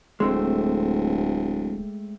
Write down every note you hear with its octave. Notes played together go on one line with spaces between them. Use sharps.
D1 G#3 A3 C4